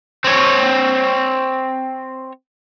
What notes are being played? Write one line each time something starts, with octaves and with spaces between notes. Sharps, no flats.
C4 C#5